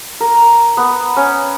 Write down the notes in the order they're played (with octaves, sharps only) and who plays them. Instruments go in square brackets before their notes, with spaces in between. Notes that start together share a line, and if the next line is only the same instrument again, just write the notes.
[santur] A#4
B3
C#4